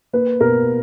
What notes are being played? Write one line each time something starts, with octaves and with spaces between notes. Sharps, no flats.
A#3 B4
B2 A#4